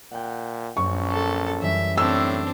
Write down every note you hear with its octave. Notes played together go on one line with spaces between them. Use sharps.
A#2 F#5 G5
A#1 F#2 C#6
A4
F#2 E3 G3 E5
A2 C4 D4 E6